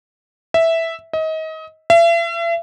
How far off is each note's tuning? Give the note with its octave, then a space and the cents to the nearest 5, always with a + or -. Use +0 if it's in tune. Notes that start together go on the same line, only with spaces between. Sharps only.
E5 -5
D#5 +30
E5 +40